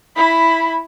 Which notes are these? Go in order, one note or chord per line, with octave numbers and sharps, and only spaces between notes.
E4 B5